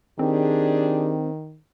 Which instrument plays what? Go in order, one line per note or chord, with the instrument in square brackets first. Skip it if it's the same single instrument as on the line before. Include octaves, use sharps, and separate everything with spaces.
[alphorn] D#3 [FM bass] C4 [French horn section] D4 G4 G#4